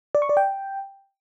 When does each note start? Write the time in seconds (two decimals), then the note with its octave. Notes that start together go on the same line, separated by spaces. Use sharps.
0.15 D5
0.22 C#6
0.29 D5
0.37 G5